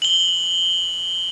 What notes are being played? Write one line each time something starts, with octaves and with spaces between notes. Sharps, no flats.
F#7 G7